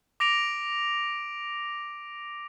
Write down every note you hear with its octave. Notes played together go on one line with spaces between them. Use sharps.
D6 A#6 D7 F7